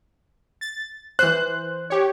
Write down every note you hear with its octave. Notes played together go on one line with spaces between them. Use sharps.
A6
E3 C5 F#6
G4 C#5